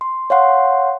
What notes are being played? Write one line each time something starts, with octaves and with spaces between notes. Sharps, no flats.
C6
C#5 F5 F#5 C6